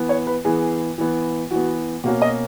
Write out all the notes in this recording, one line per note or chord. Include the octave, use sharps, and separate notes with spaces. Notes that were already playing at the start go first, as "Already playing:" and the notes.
Already playing: E3 B3
C#5
B4
E3 B3 G#4
E3 B3
E3 B3 F#4
B2 A#3 C#4 F#4
D#5